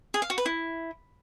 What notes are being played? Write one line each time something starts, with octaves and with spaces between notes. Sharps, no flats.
G#4
F5
F#4
B4
E4